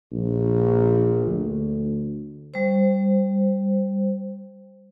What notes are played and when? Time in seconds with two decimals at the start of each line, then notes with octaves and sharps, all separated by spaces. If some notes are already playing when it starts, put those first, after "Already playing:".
0.12 A#1
1.26 D2
2.54 G3 C5